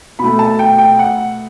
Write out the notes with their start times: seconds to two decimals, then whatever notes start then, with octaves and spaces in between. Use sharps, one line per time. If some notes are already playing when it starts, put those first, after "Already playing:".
0.19 B2 A3 B5
0.39 A5
0.59 G5
0.78 G5
0.99 F#5